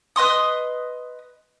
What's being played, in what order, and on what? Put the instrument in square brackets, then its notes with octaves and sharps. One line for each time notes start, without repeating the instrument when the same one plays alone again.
[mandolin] B4 D#5 C6 D#6